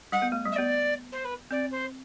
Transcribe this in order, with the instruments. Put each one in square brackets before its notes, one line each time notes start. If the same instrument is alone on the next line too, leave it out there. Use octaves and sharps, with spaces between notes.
[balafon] G3 [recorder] F#5
[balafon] B3
A3
G3
[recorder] E5
[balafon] B3 [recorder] D5
[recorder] C5
B4
[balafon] C4 [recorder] D5
[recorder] C5